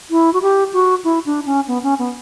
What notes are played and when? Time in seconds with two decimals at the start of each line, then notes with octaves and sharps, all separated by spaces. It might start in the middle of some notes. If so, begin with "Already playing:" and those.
0.10 E4
0.33 F#4
0.42 G4
0.73 F#4
1.04 E4
1.26 D4
1.46 C#4
1.68 B3
1.83 C#4
1.99 B3